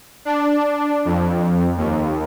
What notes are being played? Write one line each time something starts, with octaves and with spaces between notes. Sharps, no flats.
D4
F2
D#2